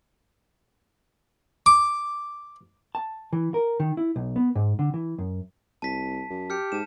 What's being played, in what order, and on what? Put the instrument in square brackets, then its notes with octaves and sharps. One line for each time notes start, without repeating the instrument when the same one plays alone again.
[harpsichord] D6
[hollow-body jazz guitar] A5
E3
A#4
D#3
E4
B1
B3
G#2
D3
E3
F#2
[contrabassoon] C2 [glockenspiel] A5 B6
[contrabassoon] F#2
[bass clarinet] G4 [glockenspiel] F6 G6 C#7
[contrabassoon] G#2 [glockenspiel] A5 E7